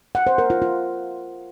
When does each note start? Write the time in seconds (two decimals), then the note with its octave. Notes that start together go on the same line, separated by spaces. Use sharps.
0.15 F#5
0.27 C5
0.38 A#4
0.50 F4
0.62 F4